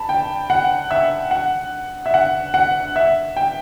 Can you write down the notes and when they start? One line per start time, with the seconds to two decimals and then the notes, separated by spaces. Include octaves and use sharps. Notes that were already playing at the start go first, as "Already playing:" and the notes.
Already playing: A5 B5
0.09 G5
0.50 F#5
0.91 E5
1.31 F#5
2.06 E5
2.14 F#5
2.54 F#5
2.96 E5
3.37 G5